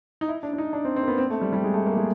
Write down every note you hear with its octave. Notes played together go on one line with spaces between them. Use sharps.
D#4
E4
D4
D4
D#4
D4
C4
C4
A#3
B3
C4
A3
G3
G3
G#3
A3
A#3
G#3